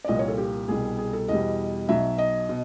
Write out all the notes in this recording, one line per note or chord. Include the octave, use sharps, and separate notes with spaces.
D5
C2 A#2 F3 D#5
C#5
A4
G4
C2 B2 G3 G#4
G#4
A4
E2 B2 G3 D#5
B1 B2 F#3 E5
D#5
B2